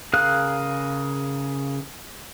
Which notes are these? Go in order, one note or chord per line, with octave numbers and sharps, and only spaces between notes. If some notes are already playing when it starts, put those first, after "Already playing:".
C#3 G#4 A#4 F5 F#6